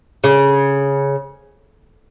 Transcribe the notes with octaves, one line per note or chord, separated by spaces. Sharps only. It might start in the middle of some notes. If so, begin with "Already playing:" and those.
C#3